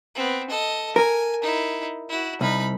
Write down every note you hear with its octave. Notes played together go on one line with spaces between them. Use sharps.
B3 C4
A4 D#5
A#4 G#5
D#4 E4
E4 F#4
C2 D#4 B5